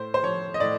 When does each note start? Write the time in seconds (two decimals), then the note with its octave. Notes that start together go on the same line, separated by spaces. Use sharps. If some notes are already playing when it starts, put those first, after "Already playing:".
Already playing: A2 C5
0.14 C5
0.23 F3 C#5
0.54 D#5
0.60 A2 D5